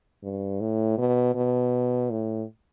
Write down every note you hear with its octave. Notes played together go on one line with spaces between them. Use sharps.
G2
A2
B2
B2
A2